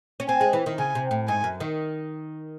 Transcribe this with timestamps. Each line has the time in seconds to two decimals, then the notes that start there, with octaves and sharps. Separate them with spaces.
0.20 C#4
0.28 C4 G#5
0.41 G#3
0.53 E3
0.66 D#3
0.78 C#3 G#5
0.95 C3
1.11 A2
1.28 G#2 G#5
1.44 F#2
1.60 D#3